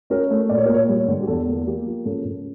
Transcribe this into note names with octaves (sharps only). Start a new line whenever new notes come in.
C#4 A#4
A3
A#2 D5
C#5
A#4
A#2 C#5
G3 C#5
D3
G4
E2 A4
A#3
A#3 G4
F3
C#3 A4
C#3